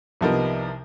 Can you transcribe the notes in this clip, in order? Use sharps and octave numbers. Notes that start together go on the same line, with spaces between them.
C2 C3 F3 B3 D#4 A#4